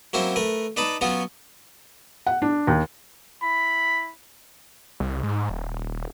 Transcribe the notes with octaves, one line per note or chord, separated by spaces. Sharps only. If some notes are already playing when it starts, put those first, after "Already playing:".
F#3 A#3 C4 C#4 E4 C5
A3 A#4 B4
D4 D#4 B4 A5 B5
F#3 B3 C#4 F4 F#4
F#5
D4
D#2
E4 B5
C2
G#2
D#1